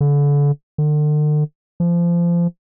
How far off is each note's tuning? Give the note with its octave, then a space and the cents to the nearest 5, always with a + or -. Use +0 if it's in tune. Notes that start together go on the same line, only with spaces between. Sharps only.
D3 -35
D3 +40
F3 -25